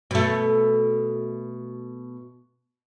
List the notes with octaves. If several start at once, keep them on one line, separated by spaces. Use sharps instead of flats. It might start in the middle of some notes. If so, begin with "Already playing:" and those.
B2 A3